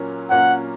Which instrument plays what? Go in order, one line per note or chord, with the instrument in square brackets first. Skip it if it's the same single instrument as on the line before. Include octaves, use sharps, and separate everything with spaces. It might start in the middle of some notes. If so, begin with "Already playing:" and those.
Already playing: [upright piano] A#2 F#3 A#3 C#4
[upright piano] A#2 F#3 A#3 C#4 [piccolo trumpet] F#5